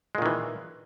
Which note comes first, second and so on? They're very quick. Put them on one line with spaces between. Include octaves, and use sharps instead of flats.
G#3 A#2 D#3 E3